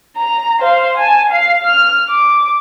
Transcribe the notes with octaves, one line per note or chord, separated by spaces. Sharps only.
A#5
C5 F5
G#5 A5
F5 C7
F6
D6